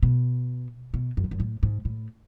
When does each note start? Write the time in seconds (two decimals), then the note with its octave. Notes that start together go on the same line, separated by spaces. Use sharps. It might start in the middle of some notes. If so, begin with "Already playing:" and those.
0.03 B2
0.94 B2
1.17 F#2
1.24 G#2
1.31 F#2
1.40 A2
1.63 G#2
1.85 A2